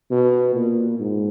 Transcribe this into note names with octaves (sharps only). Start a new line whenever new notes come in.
B2
A#2
G#2